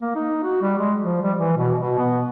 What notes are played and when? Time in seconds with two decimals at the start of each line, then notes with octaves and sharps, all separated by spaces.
0.02 A#3
0.15 D#4
0.43 F#4
0.62 G3
0.78 G#3
1.01 F3
1.22 G3
1.38 E3
1.57 B2
1.79 B2
1.98 B3